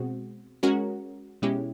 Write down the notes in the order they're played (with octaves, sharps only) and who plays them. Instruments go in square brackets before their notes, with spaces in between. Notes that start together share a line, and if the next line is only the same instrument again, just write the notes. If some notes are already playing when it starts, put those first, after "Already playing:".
Already playing: [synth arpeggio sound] B2 G#3 C4 F#4
G#3 C#4 F#4 A#4
B2 G#3 C#4 E4 G4